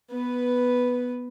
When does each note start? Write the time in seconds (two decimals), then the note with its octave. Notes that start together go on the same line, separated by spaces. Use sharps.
0.11 B3 B4